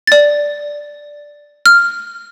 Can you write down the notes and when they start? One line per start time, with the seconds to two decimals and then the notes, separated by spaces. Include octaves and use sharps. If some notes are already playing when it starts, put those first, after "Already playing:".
0.07 D5 A6
1.66 F6